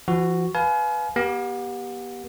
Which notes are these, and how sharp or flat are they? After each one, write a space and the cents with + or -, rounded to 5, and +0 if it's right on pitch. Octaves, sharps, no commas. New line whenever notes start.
F3 -40 F#4 +0
B4 +0 F5 +0 G#5 +40
B3 -40 G4 +0